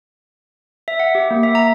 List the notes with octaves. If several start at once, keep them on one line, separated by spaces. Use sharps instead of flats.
E5
F#5
G4
A#3
E5
A#5